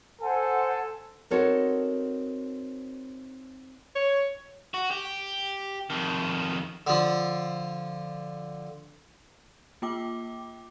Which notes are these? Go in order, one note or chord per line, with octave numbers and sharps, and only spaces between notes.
A4 C5 F#5 G#5
C4 D#4 F#4 A4 A#4 C#5
C#5
F#4
G4
F2 D#3
D3 F3
A#3 F4 G5 D6